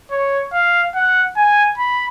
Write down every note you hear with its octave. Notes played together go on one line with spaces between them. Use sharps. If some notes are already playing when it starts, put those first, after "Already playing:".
C#5
F5
F#5
G#5
B5